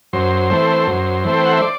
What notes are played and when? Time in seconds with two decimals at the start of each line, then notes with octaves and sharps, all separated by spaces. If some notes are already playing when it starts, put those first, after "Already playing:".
0.13 F#2 C5
0.50 E3 A3 C4
0.87 F#2
1.24 E3 A3 C4
1.37 G5
1.45 F#5
1.53 E5
1.62 D5